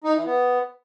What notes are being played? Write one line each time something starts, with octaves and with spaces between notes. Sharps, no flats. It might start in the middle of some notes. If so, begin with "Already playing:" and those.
D#4
E3
B3